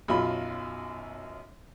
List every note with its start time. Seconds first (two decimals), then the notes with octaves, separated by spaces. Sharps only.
0.08 B1 F#2 F4 B5